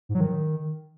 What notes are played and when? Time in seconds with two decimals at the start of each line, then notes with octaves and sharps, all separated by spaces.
0.09 G#2
0.15 F#3
0.21 D#3